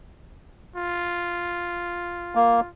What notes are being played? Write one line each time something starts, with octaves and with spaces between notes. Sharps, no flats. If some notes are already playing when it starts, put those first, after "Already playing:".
F4
A#3